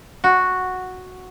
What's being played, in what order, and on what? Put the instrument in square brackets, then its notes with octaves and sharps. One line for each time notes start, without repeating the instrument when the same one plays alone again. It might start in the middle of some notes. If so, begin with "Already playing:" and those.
[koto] F#4